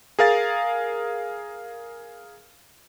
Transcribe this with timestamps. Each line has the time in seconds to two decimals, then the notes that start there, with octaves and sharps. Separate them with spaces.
0.19 G#4 A#4 F5 A6